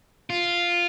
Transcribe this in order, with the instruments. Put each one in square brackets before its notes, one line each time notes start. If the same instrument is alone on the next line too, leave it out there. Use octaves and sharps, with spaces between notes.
[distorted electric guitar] F4